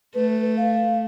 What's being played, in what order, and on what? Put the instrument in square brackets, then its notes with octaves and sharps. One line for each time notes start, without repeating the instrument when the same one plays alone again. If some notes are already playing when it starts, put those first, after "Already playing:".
[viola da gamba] A3 [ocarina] B4
[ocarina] F5